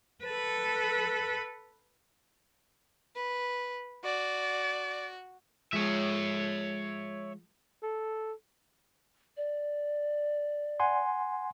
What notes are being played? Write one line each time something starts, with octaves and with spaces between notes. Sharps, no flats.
A4 B4
B4
F#4 D5
F3 G#3 C#5 E5
A4
D5
F#5 G#5 C6